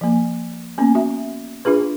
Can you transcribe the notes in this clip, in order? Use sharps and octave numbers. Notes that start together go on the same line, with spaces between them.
F3 A#3
A#3 B3 C#4
F#4 E5
D4 F4 G#4 B4